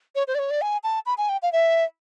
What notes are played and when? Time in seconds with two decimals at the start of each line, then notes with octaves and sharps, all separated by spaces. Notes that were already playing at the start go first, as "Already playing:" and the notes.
0.15 C#5
0.28 C5
0.35 D5
0.39 C#5
0.50 D5
0.62 G#5
0.84 A5
1.06 B5
1.18 G#5
1.29 G5
1.43 F5
1.53 E5